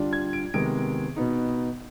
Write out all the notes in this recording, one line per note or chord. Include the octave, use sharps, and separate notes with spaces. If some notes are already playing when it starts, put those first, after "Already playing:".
Already playing: D3 G3 D4 F4
G#6
D7
C3 D#3 G#3 B3 D7
B2 B3 D#4